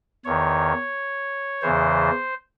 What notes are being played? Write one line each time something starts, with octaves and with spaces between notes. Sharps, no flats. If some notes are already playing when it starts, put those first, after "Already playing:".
E2 D#3 C#5
E2 C#3 E3 C5